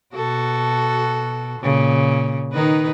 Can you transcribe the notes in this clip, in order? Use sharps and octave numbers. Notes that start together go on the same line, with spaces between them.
B2 F#4 A4
A#2 C#3
D#3 D#4 B4